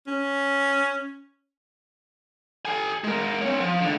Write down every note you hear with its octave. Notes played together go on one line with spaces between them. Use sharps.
C#4
A4 G#5
G#3 A#4
C4 C#5
F3
C#2 D3